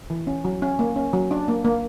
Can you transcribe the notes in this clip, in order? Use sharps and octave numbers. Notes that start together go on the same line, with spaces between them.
E3
C#4
F#3
C#4
A#3
C#4
F#3
D4
A#3
A#3